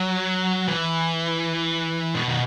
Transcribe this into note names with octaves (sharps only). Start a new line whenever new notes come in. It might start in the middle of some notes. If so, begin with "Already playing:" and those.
Already playing: F#3
E3
B2
D#3